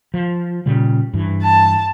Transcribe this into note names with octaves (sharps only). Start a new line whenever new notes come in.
F3
A#2 C#3 G3
G2 E3
A5